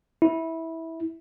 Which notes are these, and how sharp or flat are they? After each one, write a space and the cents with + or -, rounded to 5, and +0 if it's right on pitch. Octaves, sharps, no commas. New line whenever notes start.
E4 -15